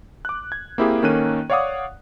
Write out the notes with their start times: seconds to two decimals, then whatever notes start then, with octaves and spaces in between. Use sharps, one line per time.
0.25 D6 F#6
0.52 G#6
0.78 A#3 C4 E4 G4 G#4
1.03 D#3 A#3 C#4 A4 F#6 D#7
1.50 C#5 D5 F5 F#5 D6 D#6